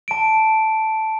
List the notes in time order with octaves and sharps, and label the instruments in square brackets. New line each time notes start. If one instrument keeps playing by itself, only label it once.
[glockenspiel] A5 D7